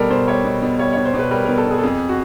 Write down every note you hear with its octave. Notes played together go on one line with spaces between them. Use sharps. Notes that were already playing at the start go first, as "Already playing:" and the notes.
Already playing: B2 G3 A4 A#4
B2 C5
G3 C#5
B2
B2
G3 C#5
B2 C#5
C5
B2
B4
G3 A#4
B2 A#4
A4
B2
G#4
A4
F2 G#4
F#4